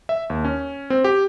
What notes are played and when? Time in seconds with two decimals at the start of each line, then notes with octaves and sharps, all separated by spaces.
0.09 E5
0.30 D#2
0.45 C#4
0.90 C4
1.04 G4